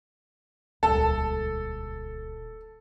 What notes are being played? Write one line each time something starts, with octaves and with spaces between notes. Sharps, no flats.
D#1 C#2 A4